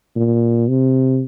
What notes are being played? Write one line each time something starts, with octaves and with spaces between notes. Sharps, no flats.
A#2
C3